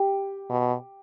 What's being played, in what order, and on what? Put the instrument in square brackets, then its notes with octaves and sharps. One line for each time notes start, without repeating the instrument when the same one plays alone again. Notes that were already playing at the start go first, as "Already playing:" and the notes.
Already playing: [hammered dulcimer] G4
[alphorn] B2